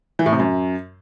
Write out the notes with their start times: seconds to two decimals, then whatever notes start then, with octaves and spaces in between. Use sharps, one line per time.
0.19 E3
0.26 A2
0.33 C3
0.39 F#2